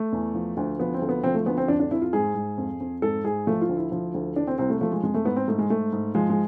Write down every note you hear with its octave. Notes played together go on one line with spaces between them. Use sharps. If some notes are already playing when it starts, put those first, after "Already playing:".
Already playing: A3
E2
F3
D2
F3 B3
C4
D2
B3
F3 C4
A3
D2 B3
C4
F2 D4
D4
F2 E4
F4
G#2 G#4
G#2
F2
F2
G#2 A4
G#2 G#4
F3 A3
F4
D2
E4
F3
D2
E3 D4
C4
C2 C4
A3
F3 A3
G#3
F2 G#3
A3
G#2 B3
C4
G#2 A3
G#3
G#2 A3
G#2
F3 G#3
G#3